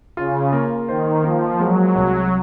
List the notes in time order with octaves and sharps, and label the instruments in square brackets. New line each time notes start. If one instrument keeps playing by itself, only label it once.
[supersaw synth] C#3 [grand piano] F4
[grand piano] A#3
[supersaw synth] D#3 [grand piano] C5
[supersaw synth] F3 [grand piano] A#3
[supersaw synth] F#3 [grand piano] G#3
[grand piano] C2